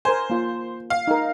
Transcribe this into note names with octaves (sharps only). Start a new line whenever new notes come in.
A#4 C5 G#5
A#3 F4
F5
D#4 A#4